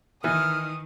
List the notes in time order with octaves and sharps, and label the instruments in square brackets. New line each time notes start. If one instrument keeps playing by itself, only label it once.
[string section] D#3 [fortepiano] E3 [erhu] D#6 [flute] F6